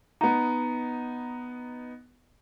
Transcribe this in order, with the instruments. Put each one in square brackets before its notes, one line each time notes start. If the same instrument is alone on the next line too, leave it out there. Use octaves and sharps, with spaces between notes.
[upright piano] B3 D#4 [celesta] A#5